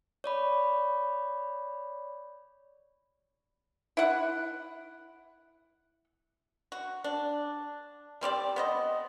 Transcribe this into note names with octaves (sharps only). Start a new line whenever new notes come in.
C#5 D5 B5
E4 F#5
F#4
D4
G3 C4 G4 D5
B3 C5 D#5